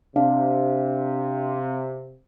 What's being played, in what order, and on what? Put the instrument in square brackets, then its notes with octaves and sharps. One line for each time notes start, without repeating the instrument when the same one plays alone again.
[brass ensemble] C3 [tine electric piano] D4 [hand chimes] F5